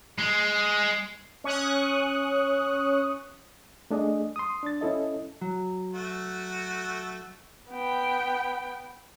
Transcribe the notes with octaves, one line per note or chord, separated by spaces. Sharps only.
G#3
C#4 C#6 D#6 F#6
A3 D4 G#4 D#5
C6 D#6
D4 A6
C#4 E4 A4 D#5
F#3
A3 F#4
B3 G5